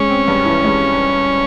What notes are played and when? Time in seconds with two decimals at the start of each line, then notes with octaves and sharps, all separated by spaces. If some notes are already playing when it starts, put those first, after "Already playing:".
Already playing: G#3 C#4
0.09 C4
0.27 G2
0.45 E3
0.64 G#3